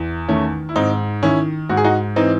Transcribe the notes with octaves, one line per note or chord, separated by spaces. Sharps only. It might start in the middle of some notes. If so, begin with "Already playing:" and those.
Already playing: E2
D#3 A3 C#4
E4
G#2 C4 D#4
D#3 C#4 E4
G#2 F#4
G#4
D#4 F#4
E3 C4 D#4